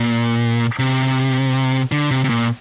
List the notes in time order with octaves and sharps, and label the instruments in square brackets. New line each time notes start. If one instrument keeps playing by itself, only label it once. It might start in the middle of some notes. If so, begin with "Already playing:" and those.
Already playing: [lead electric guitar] A#2
C3
D3
C3
C3
A#2